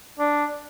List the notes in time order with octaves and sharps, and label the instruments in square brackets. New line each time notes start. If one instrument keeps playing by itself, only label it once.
[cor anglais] D4